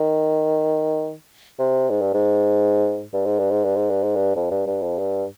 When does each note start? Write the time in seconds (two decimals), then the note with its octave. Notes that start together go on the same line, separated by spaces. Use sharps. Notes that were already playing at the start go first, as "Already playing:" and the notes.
Already playing: D#3
1.59 C3
1.90 G#2
2.02 G2
2.13 G#2
3.14 G2
3.26 G#2
3.39 G2
3.51 G#2
3.65 G2
3.76 G#2
3.90 G2
4.03 G#2
4.16 G2
4.36 F2
4.51 G2
4.66 G2
4.82 F2
4.98 G2